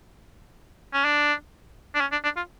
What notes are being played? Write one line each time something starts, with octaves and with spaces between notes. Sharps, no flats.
C#4
D4
D4
C#4
D4
D4
F4